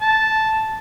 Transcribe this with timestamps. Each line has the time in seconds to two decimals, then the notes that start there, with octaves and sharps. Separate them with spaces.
0.02 A5